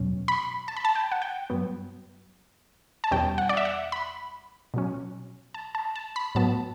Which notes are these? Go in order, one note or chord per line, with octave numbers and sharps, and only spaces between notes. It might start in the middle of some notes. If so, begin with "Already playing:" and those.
Already playing: E2 B2 F#3 C#4
B5
A5
B5
A5
G5
F#5
G5
G2 F#3 B3
A5
E2 B2 G3 C#4 G5
F#5
D5
E5
F#5
B5
B2 F#3 C#4
A5
A5
A5
B5
A2 F#3 B3 A5